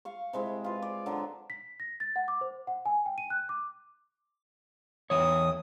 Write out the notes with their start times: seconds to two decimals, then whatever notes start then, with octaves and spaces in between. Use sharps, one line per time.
0.05 F5 C#6
0.33 C3 G#3 E4
0.64 F4 B4
0.82 D5
1.06 D3 F#3
1.50 B6
1.80 A#6
2.00 A6
2.16 F#5
2.28 D6
2.41 C5
2.67 F#5
2.86 G#5
3.06 G5
3.18 D#7
3.30 F#6
3.49 D6
5.10 E2 E3 C#5 D#6